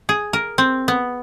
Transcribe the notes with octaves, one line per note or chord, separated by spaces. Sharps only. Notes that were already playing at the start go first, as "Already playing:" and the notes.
G#4
A#4
C4
B3